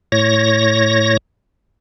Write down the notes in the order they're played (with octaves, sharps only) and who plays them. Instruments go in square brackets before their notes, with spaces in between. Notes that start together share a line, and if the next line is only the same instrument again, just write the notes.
[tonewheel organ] A2 C#5 A#6